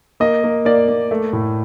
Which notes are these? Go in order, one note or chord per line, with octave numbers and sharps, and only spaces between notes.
A#3 D#5
A#3
A#3 D5
A#3
A3
A2